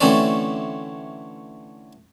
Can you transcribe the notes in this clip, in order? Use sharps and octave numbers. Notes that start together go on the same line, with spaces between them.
D3 E3 A3 C4 C#4 D5